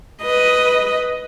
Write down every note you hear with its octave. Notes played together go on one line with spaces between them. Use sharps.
B4 D#5